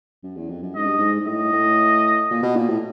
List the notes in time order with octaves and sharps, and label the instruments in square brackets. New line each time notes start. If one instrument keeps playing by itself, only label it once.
[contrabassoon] F#2
E2
F2
F#2
[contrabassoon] G#2 [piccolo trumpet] D#5
[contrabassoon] G2
G#2
G#2
[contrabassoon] A2 [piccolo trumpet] D#5
[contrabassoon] A2
A#2
B2
A#2
A2